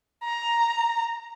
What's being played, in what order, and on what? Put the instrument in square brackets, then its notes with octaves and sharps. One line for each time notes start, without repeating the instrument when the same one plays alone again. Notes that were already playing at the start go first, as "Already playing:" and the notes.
[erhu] A#5